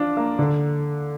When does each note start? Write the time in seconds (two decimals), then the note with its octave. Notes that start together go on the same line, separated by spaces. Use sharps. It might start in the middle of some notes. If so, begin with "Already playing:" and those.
Already playing: F3 D4 F4
0.17 A#3
0.39 D3